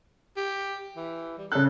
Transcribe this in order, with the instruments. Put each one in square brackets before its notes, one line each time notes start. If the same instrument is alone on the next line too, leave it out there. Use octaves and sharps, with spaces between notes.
[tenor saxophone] G4
E3
G3
[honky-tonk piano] C#3 F#6 [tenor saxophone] A4